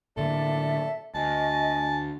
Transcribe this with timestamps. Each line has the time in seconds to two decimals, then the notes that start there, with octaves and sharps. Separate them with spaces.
0.17 A2 D3 A#3 A4 D5 E5
1.15 D2 D#5 G#5 A5